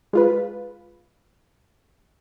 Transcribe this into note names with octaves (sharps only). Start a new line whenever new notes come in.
G#3 F4 B4